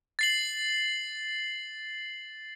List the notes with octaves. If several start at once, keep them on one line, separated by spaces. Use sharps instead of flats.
A6 C7 F#7